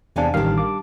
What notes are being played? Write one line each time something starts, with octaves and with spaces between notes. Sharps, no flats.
E2 C3 D4 F5 G#5
A1 D#3 G3 D4 F5
D6